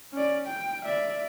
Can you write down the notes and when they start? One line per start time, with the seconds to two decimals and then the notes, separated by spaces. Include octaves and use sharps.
0.13 C#4 D5
0.47 G5
0.84 D5 E5